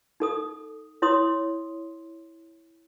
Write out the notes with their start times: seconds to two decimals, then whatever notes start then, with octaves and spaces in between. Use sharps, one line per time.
0.20 D#4 A4 D#6
1.02 E4 C#5 C6 D#6